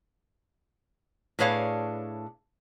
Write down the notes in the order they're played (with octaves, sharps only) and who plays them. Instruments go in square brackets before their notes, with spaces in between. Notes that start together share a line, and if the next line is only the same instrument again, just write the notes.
[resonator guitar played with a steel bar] A2 D4 G#4 B4 C#5 F5